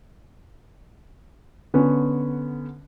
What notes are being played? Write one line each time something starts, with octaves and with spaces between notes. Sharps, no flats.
D3 B3 C#4